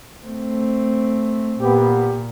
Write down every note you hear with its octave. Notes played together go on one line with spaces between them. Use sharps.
A3 C4
A#2 B3 G4